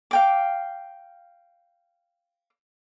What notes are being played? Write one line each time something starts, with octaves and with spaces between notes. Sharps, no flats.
F5 G5 D6